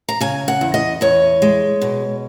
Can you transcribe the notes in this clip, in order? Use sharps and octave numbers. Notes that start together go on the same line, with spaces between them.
A#5
C#3 G#5
F#5
E2
D#5
E2 C#5
G#3
B2